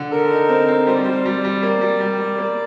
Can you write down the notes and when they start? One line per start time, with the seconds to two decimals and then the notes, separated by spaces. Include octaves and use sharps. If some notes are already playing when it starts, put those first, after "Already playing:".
Already playing: D3
0.11 A4 A#4
0.30 D#4
0.49 C4
0.68 C4
0.87 G3 C5
0.95 D5
1.02 G3 C5
1.24 G3 D5
1.44 G3
1.62 A#3
1.81 G3
2.01 G3
2.19 G3
2.38 A#3